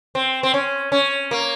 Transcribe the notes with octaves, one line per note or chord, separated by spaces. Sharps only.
C4
C4
C#4
C#4
A#3